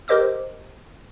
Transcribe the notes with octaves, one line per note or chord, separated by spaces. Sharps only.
G4 A#4 C5 D#5 D6 E6